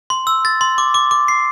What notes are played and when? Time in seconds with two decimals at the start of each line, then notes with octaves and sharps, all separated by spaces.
0.10 C6
0.27 E6
0.45 A6
0.61 C6
0.78 D6
0.94 D6
1.11 D6
1.28 C7